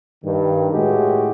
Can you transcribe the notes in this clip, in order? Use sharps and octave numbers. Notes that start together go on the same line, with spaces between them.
G2 D#3
A2 G#3 F#4 G4